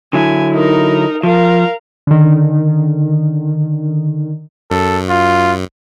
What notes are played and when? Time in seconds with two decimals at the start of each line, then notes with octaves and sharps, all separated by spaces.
0.13 D3 F#3 E4 G#5
0.53 D#4 A#4
1.23 F3 A#4 F5
2.07 D3 D#3
4.71 F#2 A4
5.10 F4